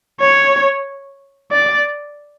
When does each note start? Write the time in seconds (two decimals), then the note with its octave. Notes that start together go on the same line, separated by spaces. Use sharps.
0.21 C#5
1.51 D5